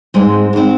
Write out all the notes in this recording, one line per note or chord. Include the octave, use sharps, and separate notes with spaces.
G#2 G#3 C4
G#2 G#3 C4